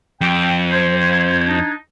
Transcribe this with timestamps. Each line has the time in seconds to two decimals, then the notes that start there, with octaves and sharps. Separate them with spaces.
0.21 F2 G5
0.71 C5 G6 G#6
1.47 D4 D#4